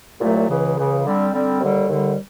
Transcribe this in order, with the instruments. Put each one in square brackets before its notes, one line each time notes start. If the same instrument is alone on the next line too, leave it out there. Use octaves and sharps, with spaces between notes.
[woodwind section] C2 A#2 F#3 A3
C#2 C#3 E3
C#2 C#3 E3
D3 G3 C4
D3 G3 C4
D#2 D3 G3
D#2 D3 G3